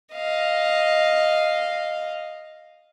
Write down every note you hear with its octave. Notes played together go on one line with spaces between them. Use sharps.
D#5 F5